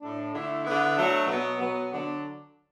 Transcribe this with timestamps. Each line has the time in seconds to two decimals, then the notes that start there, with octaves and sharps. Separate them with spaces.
0.01 A2 A3 D4
0.33 D3 A3 E4
0.64 D3 B3 E4
0.96 F#3 A3 D4 F#4
1.27 B2 F#3 B3
1.59 B2 F#3 B3
1.91 D3 F#3 D4